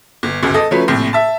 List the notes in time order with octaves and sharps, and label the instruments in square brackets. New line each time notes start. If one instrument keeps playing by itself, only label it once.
[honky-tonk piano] G1
G1 C#2 F#2
A4 D#5
F3 F#3 A3 C#4 B4
A#1 A2 C3
E5 A5